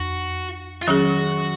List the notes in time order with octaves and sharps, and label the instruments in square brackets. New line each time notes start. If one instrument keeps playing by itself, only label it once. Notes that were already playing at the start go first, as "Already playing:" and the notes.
Already playing: [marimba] F2 [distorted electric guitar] F#4
[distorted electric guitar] F4
[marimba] D#3 F#3 C#4 G#4 [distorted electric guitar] F#4